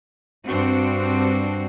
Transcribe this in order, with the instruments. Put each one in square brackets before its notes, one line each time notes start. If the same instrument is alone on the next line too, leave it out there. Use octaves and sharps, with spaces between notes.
[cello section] G2 C4 D4 F#4